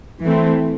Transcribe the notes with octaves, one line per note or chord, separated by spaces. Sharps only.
E3 A3 C4